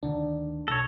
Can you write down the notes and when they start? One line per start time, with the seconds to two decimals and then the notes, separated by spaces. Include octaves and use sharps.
0.03 D2 D3 D#3 D4
0.68 B1 A4 C#5 A#6